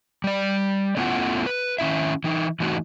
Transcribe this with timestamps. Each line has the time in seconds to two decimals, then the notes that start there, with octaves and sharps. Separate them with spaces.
0.24 G3 D5
0.97 A3 B3 C#4 E4 F4 F#5
1.46 B4
1.79 D#3 C#4 E4 E5
2.24 E3 D#4
2.60 E3 A3 D#4 E4 F#4